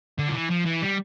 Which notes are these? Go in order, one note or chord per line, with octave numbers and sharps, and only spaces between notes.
D3
F3
E3
F3
E3
G3